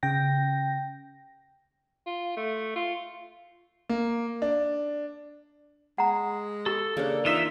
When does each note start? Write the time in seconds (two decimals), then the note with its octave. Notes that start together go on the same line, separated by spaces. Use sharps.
0.03 C#3 G5 A#6
2.06 F4
2.37 A3
2.76 F4
3.89 A#3
4.42 D4
5.98 G#3 F#5 A#5
6.66 G4 A4
6.97 C#3 A#3 D4
7.25 E3 D#4 F4 E5